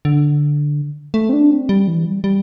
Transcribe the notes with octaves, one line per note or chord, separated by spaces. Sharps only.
D3
A3
C4
D4
C4
G3
E3
G3
G3